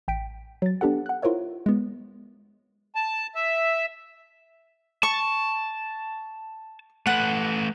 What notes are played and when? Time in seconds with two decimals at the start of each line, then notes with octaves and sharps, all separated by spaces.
0.08 A1 G5 B6 D7
0.62 F#3 A6
0.81 B3 D4 G4 A4 F#5
1.06 F#5 F#6
1.22 E4 F4 A#4 C5 C#5 E5
1.66 G#3 B3
2.96 A5
3.35 E5
5.03 A5 C#6
7.07 A3 B4 F#5